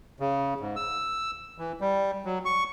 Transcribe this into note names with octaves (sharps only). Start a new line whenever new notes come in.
C#3
G#2
E6
E3
G3
F#3
C#6